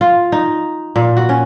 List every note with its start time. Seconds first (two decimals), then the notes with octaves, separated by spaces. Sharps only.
0.01 F4
0.32 D#4
0.96 A#2
1.17 F#4
1.29 C#4